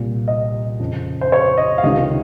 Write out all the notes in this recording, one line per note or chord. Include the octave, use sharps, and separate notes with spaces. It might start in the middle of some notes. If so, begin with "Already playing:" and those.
Already playing: C2 A#2
D#5
F2 C#3
C5
C#5
D#5
F5
C#2 C3 D#3 D#5